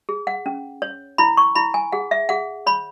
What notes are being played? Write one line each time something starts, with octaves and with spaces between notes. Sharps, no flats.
G#4
F#5
C#4
C#5
E4 B5
C#6
E4 B5
G#5
G#4 F#5
E5
G#4 F#5
C#5 B5